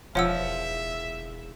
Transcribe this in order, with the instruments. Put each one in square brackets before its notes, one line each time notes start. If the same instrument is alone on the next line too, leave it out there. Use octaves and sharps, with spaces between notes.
[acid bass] E1 [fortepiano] F3 [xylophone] C#5 F#5 E6 [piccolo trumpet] E5